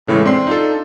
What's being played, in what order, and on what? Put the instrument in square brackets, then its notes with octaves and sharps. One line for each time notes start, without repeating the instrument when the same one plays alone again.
[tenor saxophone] A2 [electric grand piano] C#3 E3 G#3
[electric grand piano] C4 C6 C7 [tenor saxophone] D4
[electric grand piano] D#4 F4 A4